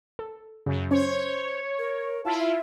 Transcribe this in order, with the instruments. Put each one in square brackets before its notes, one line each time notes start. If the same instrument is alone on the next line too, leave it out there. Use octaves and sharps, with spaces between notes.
[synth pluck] A4
[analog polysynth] F#2 [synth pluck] C#3
[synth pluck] C#4 [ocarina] C5 [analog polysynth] C#5
[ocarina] A#4
[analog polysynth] E4 F4 [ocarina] A5
[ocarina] E5